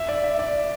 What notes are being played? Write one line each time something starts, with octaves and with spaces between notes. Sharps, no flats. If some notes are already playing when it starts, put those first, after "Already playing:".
Already playing: E5
D5
E5
D5